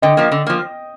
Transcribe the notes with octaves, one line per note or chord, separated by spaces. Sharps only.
D3 D#5 G5
F3 A#3
D3
F3 A#3